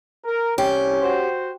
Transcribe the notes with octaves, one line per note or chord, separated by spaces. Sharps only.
A#4
C2 C#4 G4
F#4 C5